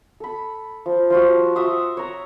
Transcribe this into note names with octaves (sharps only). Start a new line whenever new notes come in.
A4 B5
F3
F3 F4 F#4
F#4 E5 C6 D#6
C#5 A#5